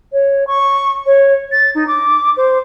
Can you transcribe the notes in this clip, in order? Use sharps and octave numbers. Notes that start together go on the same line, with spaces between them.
C#5
C#6
C#5
A6
D#4
D6
C5